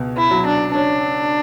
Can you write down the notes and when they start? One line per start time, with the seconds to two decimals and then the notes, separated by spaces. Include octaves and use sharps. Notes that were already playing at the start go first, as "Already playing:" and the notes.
Already playing: C#2 B2
0.17 E4
0.31 F#3
0.46 D4
0.75 C#4 D4